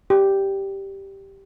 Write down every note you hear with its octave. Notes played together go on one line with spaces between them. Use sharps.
G4